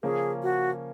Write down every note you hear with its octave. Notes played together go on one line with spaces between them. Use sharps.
C#3 F3 A#3 C#4 G#4
F#4